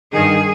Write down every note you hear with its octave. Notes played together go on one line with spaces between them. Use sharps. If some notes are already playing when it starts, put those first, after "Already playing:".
G2 D#3 G#4